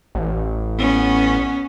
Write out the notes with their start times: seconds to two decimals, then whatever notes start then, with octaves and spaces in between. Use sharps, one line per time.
0.15 A1
0.79 B3 C#4